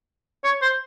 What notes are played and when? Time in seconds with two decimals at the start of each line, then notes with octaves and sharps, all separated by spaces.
0.44 C#5
0.62 C5